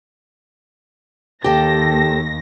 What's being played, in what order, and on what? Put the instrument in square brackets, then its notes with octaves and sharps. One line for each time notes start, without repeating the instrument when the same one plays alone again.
[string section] D#2 A#6 [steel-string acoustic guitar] G4 A4 G5